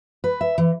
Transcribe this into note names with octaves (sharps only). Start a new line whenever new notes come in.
B4
E5
E3